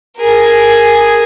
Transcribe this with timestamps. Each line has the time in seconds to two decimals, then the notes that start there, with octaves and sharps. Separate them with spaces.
0.18 G#4 A#4